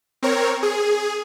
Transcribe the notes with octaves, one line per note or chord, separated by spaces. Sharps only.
C4 A#4 C#5
G#4